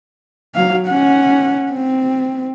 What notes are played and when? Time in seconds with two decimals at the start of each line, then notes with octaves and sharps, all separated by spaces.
0.55 F#3 F5
0.87 C#4 F#5
1.72 C4